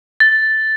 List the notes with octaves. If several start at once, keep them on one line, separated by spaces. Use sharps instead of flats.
A6